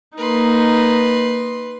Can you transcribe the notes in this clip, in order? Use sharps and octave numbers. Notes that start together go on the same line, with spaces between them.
A#3 D#4 B4 C6